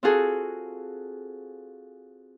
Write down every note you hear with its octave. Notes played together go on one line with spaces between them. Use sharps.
C4 F4 F#4 G#4 A4